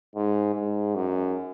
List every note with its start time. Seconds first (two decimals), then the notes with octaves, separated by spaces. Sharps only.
0.15 G#2
0.54 G#2
0.95 F#2